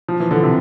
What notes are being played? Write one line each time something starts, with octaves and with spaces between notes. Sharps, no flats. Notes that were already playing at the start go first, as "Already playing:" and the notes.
F3
E3
D3
C3